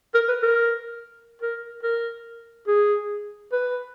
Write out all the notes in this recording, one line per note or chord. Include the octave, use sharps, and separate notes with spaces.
A#4
B4
A#4
A#4
A#4
G#4
B4